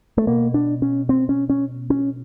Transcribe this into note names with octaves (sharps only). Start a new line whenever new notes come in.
A3
B2 A#3
D4
C#4
C4
C#4
C#4
C#4